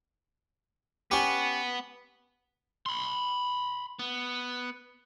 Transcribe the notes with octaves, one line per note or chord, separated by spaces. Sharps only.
B3 C#4 G4
B5 C6
B3